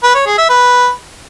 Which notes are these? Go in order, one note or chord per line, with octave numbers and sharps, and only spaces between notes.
B4
C#5
G#4
E5
B4